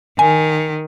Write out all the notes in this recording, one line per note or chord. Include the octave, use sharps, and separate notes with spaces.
D#3 G#5